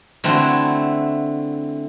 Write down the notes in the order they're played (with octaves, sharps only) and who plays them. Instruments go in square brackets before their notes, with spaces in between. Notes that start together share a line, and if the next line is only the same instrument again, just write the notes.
[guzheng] D3 A3 C4 E4 F#4